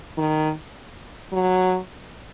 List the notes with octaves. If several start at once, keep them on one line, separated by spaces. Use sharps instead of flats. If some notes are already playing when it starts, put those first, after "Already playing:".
D#3
F#3